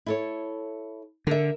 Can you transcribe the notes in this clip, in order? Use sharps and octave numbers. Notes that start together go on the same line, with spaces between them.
E4 A4 C#5
D3 A#4 E5